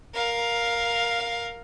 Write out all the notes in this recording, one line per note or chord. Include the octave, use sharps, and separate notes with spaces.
A#4 F5